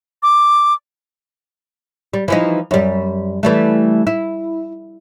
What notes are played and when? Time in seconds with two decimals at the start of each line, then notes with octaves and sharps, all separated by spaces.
0.23 D6
2.14 G3
2.28 E3 F3 D#4
2.71 F#2 G3
3.43 E3 G3 A3
4.07 E4